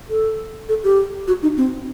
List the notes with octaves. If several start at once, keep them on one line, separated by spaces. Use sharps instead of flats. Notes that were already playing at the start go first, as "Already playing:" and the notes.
A4
A4
G4
F#4
D#4
C4